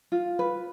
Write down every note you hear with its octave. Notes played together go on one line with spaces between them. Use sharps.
F4
B4